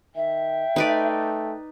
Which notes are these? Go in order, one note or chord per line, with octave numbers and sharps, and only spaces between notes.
D#3 E5 G5
A3 D#4 B4 D5